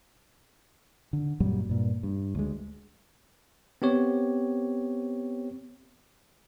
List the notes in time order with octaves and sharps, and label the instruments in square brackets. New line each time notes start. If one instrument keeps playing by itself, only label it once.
[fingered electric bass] D3
F#2 A#2 F#3 G3
G2 A#2
G2
D2 G#3
[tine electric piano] B3 C4 G4 C#5